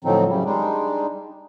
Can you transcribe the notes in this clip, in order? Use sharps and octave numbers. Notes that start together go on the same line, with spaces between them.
A2 D3 F3 F#3 C4 D#4
F#2 C#3 G3
G3 G#3 D4 D#4